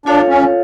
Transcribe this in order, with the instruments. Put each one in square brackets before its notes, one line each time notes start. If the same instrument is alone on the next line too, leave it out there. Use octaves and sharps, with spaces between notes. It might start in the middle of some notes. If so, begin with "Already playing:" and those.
[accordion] D4 [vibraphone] F4 A4 C#5 F5
[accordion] C#4